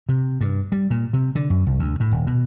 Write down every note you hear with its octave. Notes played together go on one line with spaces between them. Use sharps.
C3
G2
G3
A#2
C3
D3
F#2
C2
D2
A2
D#1
B2